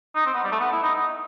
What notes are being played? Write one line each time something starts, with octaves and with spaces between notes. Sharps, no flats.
D#4
C4
B3
G3
A3
B3
E4
D#4
D#4